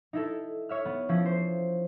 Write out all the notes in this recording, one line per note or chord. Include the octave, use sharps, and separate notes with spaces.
D#4 E4 A4
C#5 E5 F6
B3
F3 C#4 E4
C5